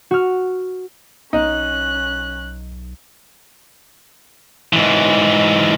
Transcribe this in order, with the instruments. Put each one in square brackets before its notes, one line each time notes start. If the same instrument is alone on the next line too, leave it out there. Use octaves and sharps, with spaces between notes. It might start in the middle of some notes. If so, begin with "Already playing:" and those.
[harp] F#4 F6
[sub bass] B1 [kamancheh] C#4 F#6 [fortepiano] D#4
[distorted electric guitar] G#2 E3